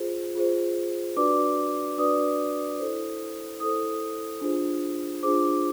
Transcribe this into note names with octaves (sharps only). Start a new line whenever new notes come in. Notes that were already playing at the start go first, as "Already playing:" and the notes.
Already playing: F4 G#4 C5
F4 G#4 C5
D4 F#4 B4 D5 D6
D4 F#4 B4 D5 D#6
E4 A4 C5
E4 A4 C5 D#6
D4 F4 G#4 C5
D4 F4 G#4 C5 D6